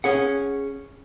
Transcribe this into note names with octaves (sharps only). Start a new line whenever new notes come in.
C#4 G#4 F#5